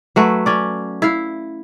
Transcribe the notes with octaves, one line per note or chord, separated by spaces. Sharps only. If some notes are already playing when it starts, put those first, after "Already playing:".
F#3 A3 B4
C#4 D5
E4 F5